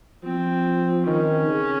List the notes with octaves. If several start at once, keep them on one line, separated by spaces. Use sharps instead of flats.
F3 C4
D#3 C#4
C#3